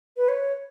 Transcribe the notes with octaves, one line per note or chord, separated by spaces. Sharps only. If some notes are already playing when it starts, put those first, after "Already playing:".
B4
C#5